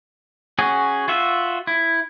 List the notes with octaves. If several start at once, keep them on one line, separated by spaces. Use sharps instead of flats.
C#4 F#4 G#4
F4 F#4 E5
E4